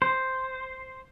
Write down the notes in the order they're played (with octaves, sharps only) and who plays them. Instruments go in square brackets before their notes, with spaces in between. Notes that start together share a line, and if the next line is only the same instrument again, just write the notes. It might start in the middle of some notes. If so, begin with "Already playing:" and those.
[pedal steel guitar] C5